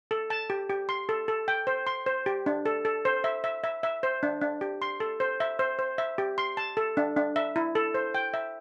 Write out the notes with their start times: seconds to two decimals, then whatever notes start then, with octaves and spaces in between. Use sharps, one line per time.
0.11 A4
0.30 A5
0.50 G4
0.70 G4
0.89 C6
1.09 A4
1.28 A4
1.48 G5
1.67 C5
1.87 C6
2.06 C5
2.26 G4
2.46 D4
2.66 A4
2.85 A4
3.05 C5
3.24 E5
3.44 E5
3.64 E5
3.83 E5
4.03 C5
4.23 D4
4.41 D4
4.61 G4
4.82 C6
5.00 A4
5.20 C5
5.40 E5
5.59 C5
5.79 C5
5.98 E5
6.18 G4
6.38 C6
6.57 A5
6.77 A4
6.97 D4
7.17 D4
7.36 E5
7.56 E4
7.75 A4
7.94 C5
8.14 G5
8.34 E5